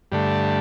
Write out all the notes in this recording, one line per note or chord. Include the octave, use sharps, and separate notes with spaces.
G2 D3 A3